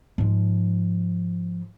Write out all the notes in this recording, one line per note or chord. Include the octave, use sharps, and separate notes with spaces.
G#2 F3